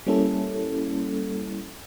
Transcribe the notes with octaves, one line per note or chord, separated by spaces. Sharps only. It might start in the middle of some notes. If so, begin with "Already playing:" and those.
G3 A#3 C#4 E4 A4